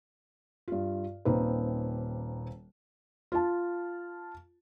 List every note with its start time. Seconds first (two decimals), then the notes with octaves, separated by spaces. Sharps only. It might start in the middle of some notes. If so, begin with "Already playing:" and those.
0.68 G2 F4
1.25 D#1 A#3 C4 D#4 B4
3.32 F4 A5